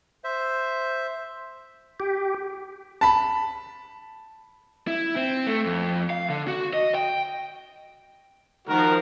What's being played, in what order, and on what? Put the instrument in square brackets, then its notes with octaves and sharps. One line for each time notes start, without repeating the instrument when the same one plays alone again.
[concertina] C5 E5
[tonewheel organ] G4
[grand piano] A5 B5
[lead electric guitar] E4
C4
A3
F2
F5
D3
F#4
D#5
G5
[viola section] D#3 F3 [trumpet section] F#4 A#4